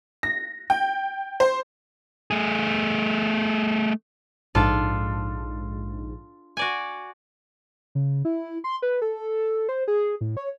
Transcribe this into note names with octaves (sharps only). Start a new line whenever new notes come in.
A#6
G5
C5
A3 G#4
A#1 G#2 D4 F4 A4
F#4 D5 G#5
C#3
E4
C6
B4
A4
C5
G#4
A2
C#5